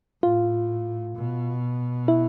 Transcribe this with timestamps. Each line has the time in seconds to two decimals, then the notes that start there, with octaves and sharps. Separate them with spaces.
0.23 A2 F4
1.16 B2
2.08 E4